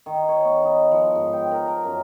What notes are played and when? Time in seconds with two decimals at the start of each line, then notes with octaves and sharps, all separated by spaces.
0.06 D#3
0.29 C#5
0.45 B3
0.64 D#4
0.92 F3
1.15 G#2
1.33 G5
1.51 A#4
1.68 A#4
1.85 F#2